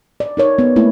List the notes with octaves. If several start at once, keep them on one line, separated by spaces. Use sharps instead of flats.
D5
D#4 A#4 C#5
B3
A3 A#3 E4